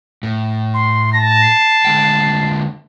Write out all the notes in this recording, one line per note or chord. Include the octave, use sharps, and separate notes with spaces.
A2
C6
A5 A#6
C7
D3 G#3 G5